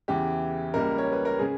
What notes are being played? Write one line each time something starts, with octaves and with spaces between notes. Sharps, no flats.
E2 C#3 E3 G4
C#2 C#3 G3 A#3 A#4
C#5
B4
A#4
C#3 G#3 G#4